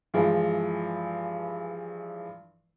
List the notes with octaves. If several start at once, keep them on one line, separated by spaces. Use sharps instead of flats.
G2 E3 F3 G#3 E4